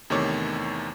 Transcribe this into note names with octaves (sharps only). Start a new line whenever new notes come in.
E2 C3 D#3 A3 C#5 D6